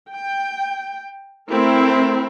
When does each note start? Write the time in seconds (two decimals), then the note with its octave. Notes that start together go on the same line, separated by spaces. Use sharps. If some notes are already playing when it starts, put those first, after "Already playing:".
0.11 G5
1.50 A3 C4 E4 A#4